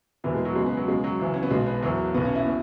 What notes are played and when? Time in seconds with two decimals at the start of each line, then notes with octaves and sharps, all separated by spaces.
0.24 E1 E2 E3 B3
0.35 G#3
0.45 F#3
0.56 C#2 B2 G#3
0.66 B3
0.77 F#3
0.87 C#2 B2 G#3
1.04 F#3
1.20 C#2 C#3 E3
1.34 C#4
1.43 B3
1.51 B1 B2 G#3
1.66 B3
1.82 E1 E2 E3 F#3
2.14 B1 B2 B3
2.25 C#4
2.35 E4
2.46 B2